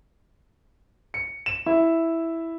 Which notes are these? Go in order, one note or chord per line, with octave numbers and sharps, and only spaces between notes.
C#7
E7
E4